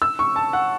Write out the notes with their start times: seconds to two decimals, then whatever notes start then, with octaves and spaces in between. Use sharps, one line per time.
0.02 E6
0.19 C#6
0.36 A5
0.53 F#5